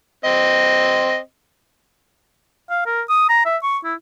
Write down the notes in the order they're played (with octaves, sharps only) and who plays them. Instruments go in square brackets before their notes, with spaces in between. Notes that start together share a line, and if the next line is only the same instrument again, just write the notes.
[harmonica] C4 D#5
[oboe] F5
A#4
D#6
A#5
E5
C#6
E4